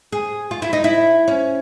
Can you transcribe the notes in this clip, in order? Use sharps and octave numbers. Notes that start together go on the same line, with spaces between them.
G#4
F4
E4
D#4
E4
C#4